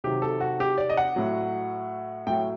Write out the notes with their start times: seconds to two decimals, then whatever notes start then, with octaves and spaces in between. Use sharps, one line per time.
0.04 C3 D#3 F#3 G4
0.22 A4
0.41 F#4
0.60 G4
0.78 D5
0.90 D#5
0.97 F#5
1.16 A2 F#3
2.27 A2 F#3 G5